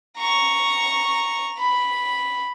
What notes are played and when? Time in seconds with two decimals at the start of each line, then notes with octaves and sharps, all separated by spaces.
0.18 A#5 C#6
1.58 B5